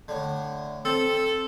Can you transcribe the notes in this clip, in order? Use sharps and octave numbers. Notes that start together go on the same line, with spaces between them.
A2 D3
C4 A4